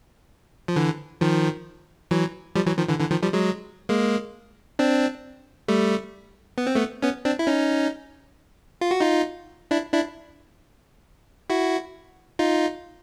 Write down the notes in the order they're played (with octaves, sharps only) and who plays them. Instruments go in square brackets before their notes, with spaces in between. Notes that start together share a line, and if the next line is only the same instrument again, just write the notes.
[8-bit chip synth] F3
D3 E3
D#3 F3
E3 F#3
F3 G3
E3 F#3
D#3 F3
D3 E3
D3 E3
D#3 F3
F3 G3
F#3 G#3
G#3 A#3
C4 D4
G3 A3
B3
C4
A3 B3
B3 C#4
C4 D4
E4
C#4 D#4
F4
F#4
D#4 F4
D4 E4
D4 E4
E4 F#4
D#4 F4